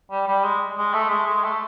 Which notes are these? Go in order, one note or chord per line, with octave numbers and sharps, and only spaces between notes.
G3
G3
G#3
G#3
A3
G#3
G#3
A3